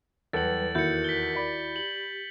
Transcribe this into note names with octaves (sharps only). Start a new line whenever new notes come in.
E2 F#3 G3 A4 B4 A6 F#7
D#2 E4 F#4 A#4 G6 C#7
B6 G7
D5 B5
G4 F#7